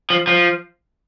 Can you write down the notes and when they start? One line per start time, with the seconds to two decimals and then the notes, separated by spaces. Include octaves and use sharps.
0.10 F3
0.27 F3